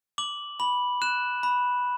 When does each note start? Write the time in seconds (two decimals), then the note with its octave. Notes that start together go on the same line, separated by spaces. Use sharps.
0.18 D6 F#7
0.60 B5 F#7
1.02 F#6 E7
1.43 B5